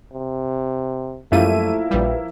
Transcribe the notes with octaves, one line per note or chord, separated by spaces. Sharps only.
C3
F#2 F3 G3 A3 A#3 E4 D#7
A#1 G3 B4